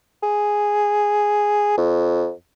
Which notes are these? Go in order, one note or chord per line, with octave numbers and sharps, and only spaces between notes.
G#4
F2